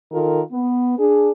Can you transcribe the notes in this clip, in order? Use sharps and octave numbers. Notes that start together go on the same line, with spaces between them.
D#3 F4 A4 A#4
B3
D4 G#4